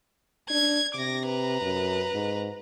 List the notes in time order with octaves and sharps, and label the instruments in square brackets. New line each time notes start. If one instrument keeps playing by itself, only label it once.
[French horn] D4 [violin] G#6
[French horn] C3 [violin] D6 A#6
[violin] B4 A#5
[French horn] F#2
G#2